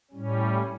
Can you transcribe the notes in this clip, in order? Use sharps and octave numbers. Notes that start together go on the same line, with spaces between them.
A2 G3 C#4